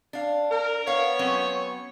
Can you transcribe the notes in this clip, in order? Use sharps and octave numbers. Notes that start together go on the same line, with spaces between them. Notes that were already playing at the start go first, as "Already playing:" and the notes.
D4 F5
A#4
B3 C#5 F5
F#3 C4 C#4